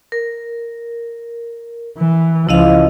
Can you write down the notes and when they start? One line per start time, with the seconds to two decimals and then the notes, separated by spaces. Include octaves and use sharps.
0.12 A#4
1.98 E3
2.49 C#2 F3 E4 D#5 F5